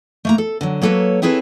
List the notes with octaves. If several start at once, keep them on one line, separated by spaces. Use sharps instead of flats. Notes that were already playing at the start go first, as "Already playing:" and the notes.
A3 A#3 A#5
A4
D3 F#3
F#3 A#3 A4 B4 C#5
C4 E4 G#4 A4 B4 C#5